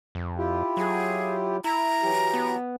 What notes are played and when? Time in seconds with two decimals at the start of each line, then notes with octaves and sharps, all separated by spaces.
0.15 F2
0.38 E4 F4 G4
0.77 F#3 G#4
1.64 E4 A#5
2.03 E3 F#3 G4
2.34 B3